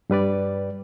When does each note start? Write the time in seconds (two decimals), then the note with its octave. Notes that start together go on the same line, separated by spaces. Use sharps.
0.10 G2 G3 B4 D5